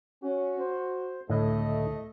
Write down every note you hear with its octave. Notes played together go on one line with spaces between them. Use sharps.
C#4 F#4
C5
C#2 A2 D3 A3 E4 D#5